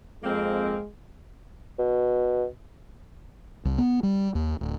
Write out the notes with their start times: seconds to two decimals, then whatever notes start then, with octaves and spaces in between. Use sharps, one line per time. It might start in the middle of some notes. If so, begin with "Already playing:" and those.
0.24 F2 G#3 A#3 C4
1.79 B2
3.65 C2
3.78 B3
4.03 G3
4.35 D#2
4.61 D1